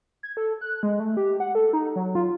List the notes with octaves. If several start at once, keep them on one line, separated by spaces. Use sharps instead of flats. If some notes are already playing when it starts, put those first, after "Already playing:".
G#6
A4
F#6
G#3
A3
G4
F#5
A4
D#4
F#3
F4